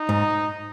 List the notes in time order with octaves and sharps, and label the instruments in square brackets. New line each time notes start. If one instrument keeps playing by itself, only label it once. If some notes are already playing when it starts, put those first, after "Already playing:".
Already playing: [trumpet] D#4
[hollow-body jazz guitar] G#2